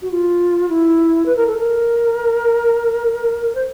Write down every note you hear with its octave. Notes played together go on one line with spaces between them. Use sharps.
F#4
F4
E4
B4
A#4
A4
A#4
C5